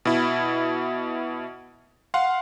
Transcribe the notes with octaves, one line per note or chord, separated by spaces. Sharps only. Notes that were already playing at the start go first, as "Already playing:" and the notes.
B2 E4
F5 F#5 C6